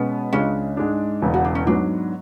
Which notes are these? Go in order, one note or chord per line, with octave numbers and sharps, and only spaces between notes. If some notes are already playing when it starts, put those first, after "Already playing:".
Already playing: B2 G#3 B3 C#4
C#2 C#3 G#3 C#4 D4 G#4
G#2 G#3 D4
E1 E2 C#3
F#4
D4
C#4
G#2 F#3 B3 D4